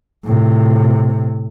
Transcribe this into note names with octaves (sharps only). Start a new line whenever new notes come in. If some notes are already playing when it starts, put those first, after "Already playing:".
A2 C3